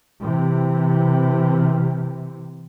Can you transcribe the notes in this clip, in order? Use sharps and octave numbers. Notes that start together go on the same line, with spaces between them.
C3 E3